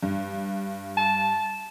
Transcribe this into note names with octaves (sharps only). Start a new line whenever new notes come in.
G2
A5